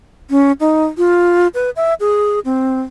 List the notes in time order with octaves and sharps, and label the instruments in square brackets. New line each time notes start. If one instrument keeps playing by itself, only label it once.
[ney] C#4
D#4
F4
B4
E5
G#4
C4